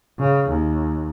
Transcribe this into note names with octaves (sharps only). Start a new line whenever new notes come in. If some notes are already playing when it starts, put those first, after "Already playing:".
C#3
D#2